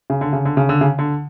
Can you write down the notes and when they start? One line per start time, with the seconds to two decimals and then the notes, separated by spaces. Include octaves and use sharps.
0.10 C#3
0.21 D3
0.33 C#3
0.45 D3
0.57 C#3
0.69 D3
0.81 C#3
0.99 D3